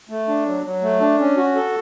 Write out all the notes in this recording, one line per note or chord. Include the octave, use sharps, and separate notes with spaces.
A3
D4
F#3
F#3
A3
D4
C#4
F#4
A4